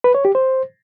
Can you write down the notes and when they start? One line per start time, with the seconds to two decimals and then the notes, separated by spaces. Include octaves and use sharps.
0.04 B4
0.15 C#5
0.25 G4
0.35 C5